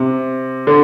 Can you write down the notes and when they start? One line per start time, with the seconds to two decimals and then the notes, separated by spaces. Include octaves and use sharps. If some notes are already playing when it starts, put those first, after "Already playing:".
Already playing: C3
0.67 D3